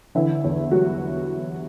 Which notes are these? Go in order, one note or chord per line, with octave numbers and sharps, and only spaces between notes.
D3 E3 E4
E2
F#3 G3 F#4